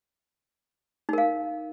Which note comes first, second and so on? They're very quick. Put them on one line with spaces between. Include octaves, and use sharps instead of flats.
D#4 A#4 F5